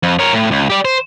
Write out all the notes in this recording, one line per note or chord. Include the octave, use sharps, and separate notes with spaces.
F2
A#4 C#5
A2
C#2
G4 D5
C5